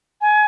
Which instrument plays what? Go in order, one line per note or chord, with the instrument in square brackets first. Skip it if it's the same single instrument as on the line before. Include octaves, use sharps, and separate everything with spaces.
[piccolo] G#5